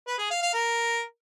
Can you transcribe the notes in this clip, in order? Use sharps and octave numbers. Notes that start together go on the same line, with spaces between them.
B4
G#4
F5
F5
A#4